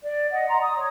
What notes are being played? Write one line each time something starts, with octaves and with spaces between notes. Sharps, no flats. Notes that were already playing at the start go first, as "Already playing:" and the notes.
D5
D5 D#5 F#5
A#5 C6
D#6
C#5